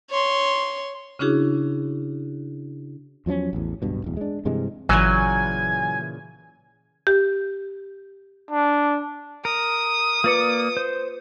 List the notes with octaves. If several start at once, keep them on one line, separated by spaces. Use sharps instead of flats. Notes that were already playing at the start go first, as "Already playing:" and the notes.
C#5 C6
C#3 C#4 D4 E4 F#4 G#4
E2 F3 F#3 C#4
A1 E2
D1 G2 B2
D1 E2
G#3 D4
G2 C3 E3 G#3
G#1 A#2 C#3 E3 F#3 G#5
G4
D4
A#4 D#6
A#3 F4 B4 D5 D6 C#7
C5